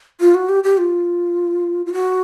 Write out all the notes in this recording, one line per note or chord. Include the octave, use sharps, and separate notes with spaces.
F4
F#4
G4
G4
F4
F4
F#4